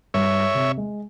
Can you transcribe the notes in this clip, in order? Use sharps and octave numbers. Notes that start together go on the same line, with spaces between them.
G2 C#5 E5
C3
G#3